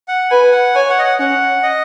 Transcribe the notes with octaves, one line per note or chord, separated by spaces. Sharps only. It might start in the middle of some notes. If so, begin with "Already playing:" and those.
F#5
B4 G#5
F#5
C#5 G#5
F#5
D#5
F#5
C#4 F#5
D#5